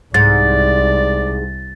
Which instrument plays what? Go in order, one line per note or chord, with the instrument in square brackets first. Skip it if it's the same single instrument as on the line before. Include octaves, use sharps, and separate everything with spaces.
[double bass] C2 [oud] G#2 [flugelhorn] D5 [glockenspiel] A6